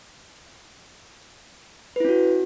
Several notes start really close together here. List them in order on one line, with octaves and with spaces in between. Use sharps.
B4 E4 C#4 F#4